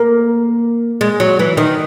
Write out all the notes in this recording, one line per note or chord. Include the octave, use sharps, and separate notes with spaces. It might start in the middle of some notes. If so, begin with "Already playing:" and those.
Already playing: A#3
G#3
F#3
E3
D#3